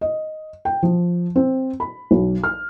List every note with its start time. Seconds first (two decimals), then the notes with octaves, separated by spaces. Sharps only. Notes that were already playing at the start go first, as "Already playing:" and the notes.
0.01 D#5
0.65 G5
0.83 F3
1.36 C4
1.80 B5
2.11 B1
2.44 F6